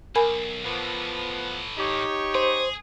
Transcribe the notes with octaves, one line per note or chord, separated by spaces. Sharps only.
B1 A#4 G#5 B5
A2 E3 F3 B3
D#4 G4 C#5
G#4 C5